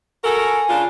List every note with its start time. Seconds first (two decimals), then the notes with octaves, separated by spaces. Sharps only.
0.24 F#4 A4 A#4 G#5
0.70 C#3 D4 F4